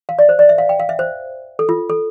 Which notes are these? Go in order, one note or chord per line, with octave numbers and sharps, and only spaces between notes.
F5
D5
C5
D5
E5
F5
G5
F5
E5
C5
A4
F4
A4